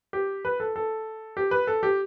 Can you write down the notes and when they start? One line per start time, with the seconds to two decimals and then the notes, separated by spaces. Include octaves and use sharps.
0.13 G4
0.45 B4
0.60 A4
0.76 A4
1.37 G4
1.51 B4
1.67 A4
1.83 G4